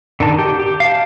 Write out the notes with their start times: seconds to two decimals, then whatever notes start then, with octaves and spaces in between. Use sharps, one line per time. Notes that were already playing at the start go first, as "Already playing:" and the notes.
0.20 D3 D#3 A5
0.38 G4
0.60 G4
0.80 F5 A5